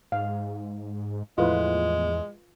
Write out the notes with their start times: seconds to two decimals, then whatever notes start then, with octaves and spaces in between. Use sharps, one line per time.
0.12 G#2 F5
1.38 E2 A2 F3 G#3 F4 B4